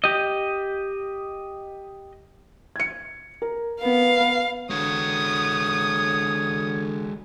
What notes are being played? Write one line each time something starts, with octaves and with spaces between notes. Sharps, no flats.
G4 D#5
G#6 C#7
A#4
B3 F5
D3 G#3 F#4 C#5 D#6